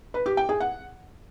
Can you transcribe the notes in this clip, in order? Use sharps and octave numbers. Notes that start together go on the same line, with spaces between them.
B4
G4
G5
G#4
F#5